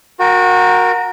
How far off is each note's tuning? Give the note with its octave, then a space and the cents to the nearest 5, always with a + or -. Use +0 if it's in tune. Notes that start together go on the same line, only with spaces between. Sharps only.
F#4 -25 A#4 +0 G5 +0